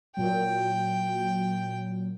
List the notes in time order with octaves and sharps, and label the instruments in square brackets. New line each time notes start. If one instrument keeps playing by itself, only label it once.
[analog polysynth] A#2 F#3 [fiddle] G5